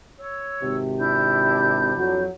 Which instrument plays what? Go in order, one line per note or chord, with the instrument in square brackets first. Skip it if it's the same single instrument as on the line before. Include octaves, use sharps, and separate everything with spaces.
[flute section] C#5 E6
[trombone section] G#1 C3
[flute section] D4 E4 G6
[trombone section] F2 F#3